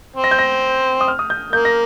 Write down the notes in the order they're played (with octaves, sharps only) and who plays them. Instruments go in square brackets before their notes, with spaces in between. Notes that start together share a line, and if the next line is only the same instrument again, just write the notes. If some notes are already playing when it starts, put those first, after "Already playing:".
[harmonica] C4
[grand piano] A#6
G6
A#6
D#6
F6
D#6
G6
[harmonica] A#3 [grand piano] G6
[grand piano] A#6